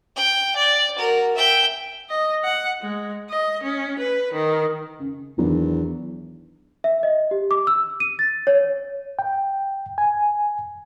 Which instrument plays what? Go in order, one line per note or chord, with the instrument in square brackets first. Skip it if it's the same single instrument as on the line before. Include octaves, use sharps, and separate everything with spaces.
[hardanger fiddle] G5
D5
F#4 A#4
E5 G5
[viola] D#5
F#5
G#3
D#5
C#4
B4
D#3
[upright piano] C#3
[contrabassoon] E2 [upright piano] D#3 F#3 D4
[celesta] E5
D#5
G4
D6
E6
D#7
A6
C#5
[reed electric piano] G5
G#5